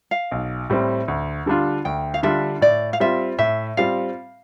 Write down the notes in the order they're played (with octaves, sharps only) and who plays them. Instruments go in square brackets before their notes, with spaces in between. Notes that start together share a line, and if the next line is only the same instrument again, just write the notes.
[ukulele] F5
[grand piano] B1
A2 G3 C4
D2
D3 G3 D4 F4
[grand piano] D2 [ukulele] G5
[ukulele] F5
[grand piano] D3 G3 D4 F4 [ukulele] E5
[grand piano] A2 [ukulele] D5
[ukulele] F5
[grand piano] G3 C4 F4 [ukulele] E5
[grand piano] A2 [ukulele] E5
[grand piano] G3 C4 F4 [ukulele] F5